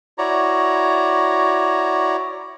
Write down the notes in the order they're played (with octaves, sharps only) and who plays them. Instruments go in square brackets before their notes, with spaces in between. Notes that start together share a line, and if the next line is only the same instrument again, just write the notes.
[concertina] E4 F#4 C#5 D5 A#5